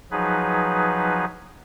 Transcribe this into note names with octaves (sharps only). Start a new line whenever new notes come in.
F3 F#3 D#4 G#4 B4